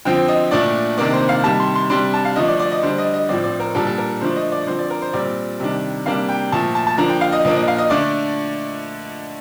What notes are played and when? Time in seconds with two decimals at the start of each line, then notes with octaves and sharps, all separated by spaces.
0.05 D3 F3 C4 G5
0.28 D#5
0.51 A#2 A3 D4 D5
0.98 C3 D#3 A#3 D4 D5
1.13 C5
1.29 F5
1.44 C3 D#3 G3 A5
1.60 C6
1.75 C6
1.90 C3 G3 D4 C6
2.14 A5
2.25 F5
2.36 D3 F3 A3 D4 D#5
2.48 D5
2.59 D5
2.72 D#5
2.83 D3 G3 D4 C5
2.98 D#5
3.14 D#5
3.29 A2 F3 C4 D5
3.44 D5
3.60 A#4
3.75 A#2 G3 D4 A4
3.87 A4
3.98 A#4
4.21 D3 F3 A3 D4 C5
4.36 D#5
4.52 D5
4.67 D3 F3 C4 C5
4.79 D5
4.90 A#4
5.02 C5
5.13 A#2 G3 C4 D5
5.60 C3 D#3 G3 D4
6.06 C3 G3 A#3 D4 F5
6.29 G5
6.52 A#2 F3 A3 A5
6.75 A5
6.87 A5
6.98 D3 F3 A#3 D4 A#5
7.10 G5
7.21 F5
7.32 D#5
7.45 A#2 F3 A#3 D4 D#5
7.56 D#5
7.68 F5
7.78 D#5
7.90 D3 A3 D4 D5